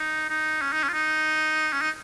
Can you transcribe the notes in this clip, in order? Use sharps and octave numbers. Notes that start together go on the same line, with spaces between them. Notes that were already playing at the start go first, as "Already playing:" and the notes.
Already playing: D#4
D#4
C#4
D#4
C#4
F4
D#4
C#4
D#4